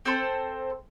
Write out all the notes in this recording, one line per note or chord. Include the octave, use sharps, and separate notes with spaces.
C4 A4 C5